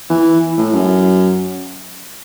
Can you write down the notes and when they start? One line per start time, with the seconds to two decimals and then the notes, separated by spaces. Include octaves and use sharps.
0.10 E3
0.58 A2
0.74 F#2